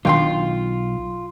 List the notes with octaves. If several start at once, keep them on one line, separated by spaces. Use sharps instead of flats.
B1 B2 D#3 D4 F4 G5 C6